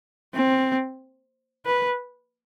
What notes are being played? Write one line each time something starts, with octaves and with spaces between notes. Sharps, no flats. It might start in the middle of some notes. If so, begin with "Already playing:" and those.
C4
B4